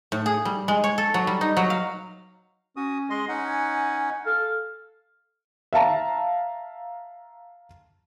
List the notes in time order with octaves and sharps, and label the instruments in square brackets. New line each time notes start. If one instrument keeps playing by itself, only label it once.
[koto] A2
G#4
G3
G#3
C#5
A4
F#3
G3
D#4
F#3
F5
[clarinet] C#4 [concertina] F#4 D#6
[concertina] G#3 D#5 C6
C#4 D#4 F#5
[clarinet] G#5
[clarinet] A4 [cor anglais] F5
[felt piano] E5 F5 A5 A#5